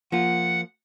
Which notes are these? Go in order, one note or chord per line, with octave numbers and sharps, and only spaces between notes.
F3 A#3 F4 F#5